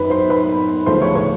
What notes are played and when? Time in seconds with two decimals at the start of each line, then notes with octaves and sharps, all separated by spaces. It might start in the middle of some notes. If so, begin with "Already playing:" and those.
Already playing: F#2 D#3 F#3 B4 B5
0.10 C5 C6
0.29 B4 B5
0.86 D2 C#3 F3 A3 C5 C6
1.01 C#5 C#6
1.16 C#5 C#6